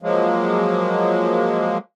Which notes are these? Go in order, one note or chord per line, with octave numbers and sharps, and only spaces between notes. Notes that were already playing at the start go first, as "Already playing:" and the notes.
F3 F#3 G#3 A#3